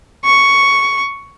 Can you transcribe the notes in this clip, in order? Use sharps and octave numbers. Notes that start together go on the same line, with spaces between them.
C#6